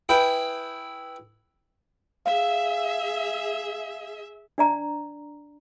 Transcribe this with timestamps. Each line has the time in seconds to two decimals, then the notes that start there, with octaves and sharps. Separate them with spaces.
0.09 E4 G#4 B4 G5
2.26 G#4 E5 F5
4.58 D4 D5 A#5